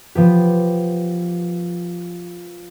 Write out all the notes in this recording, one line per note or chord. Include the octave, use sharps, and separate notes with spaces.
F3 B3 G4